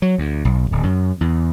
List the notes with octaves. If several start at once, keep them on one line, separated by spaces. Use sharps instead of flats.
F#3
D2
B1
D1
F#2
E2